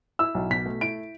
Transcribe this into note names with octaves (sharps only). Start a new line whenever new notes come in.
E4 E6
B1
B2 B6
A3
E4 D7